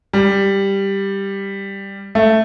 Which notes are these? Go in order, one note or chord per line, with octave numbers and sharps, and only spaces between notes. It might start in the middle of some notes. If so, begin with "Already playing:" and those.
G3
A3